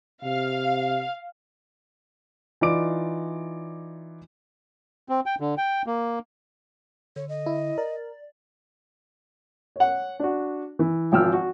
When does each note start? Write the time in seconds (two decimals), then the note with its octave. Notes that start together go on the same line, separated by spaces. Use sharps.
0.24 C3 F5
2.61 E3 D#4 F4 D5 D6 D7
5.09 C4
5.26 G5
5.40 D3
5.58 G5
5.87 A#3
7.16 D3 C#5
7.29 D#5
7.46 E4
7.78 A#4 D5
9.76 C#5 F#5
10.20 D4 F#4
10.79 E3
11.12 G#1 F3 G5 E6 F6
11.33 F#4